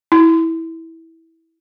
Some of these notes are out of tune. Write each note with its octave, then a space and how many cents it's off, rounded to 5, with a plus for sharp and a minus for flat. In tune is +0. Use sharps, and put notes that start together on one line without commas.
E4 -15